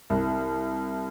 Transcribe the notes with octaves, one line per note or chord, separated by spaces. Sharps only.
C2